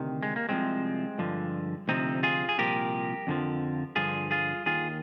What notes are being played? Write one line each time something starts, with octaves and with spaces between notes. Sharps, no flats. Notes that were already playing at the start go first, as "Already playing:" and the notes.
Already playing: D2 C3 D#3
G#3
A#3
C2 C3 F3 G#3 C4
G2 D3 F3
D2 C3 F3 C4 D#4
F4 G#4
G#4
C2 A#2 F3 G4 A#4
F2 D3 F3
G2 D3 F3 F4 G#4
F4 G#4
D#2 D#3 F4 G#4